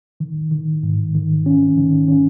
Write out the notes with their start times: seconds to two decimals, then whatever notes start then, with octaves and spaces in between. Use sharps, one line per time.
0.20 D#3
0.51 D#3
0.83 G#2
1.15 D#3
1.46 C#4
1.78 D#3
2.08 C#4